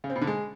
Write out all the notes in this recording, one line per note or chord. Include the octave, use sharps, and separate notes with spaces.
C#3
C4
B2
D3
G#3